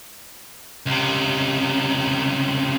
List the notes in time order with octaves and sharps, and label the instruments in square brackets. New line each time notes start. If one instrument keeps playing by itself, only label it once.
[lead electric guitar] C#2 C3